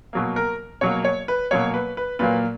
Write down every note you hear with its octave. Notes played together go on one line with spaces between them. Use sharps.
B2 F#3 A#3
A#4
B2 F#3 A#3 C#5
C#5
B4
B2 F#3 A#3 C#5
B4
B4
A#2 F#3 A#3 B4